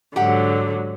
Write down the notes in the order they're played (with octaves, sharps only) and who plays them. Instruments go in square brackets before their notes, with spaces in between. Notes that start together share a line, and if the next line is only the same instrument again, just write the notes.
[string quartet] G#2 D3 F#3 [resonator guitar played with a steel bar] G4 F#5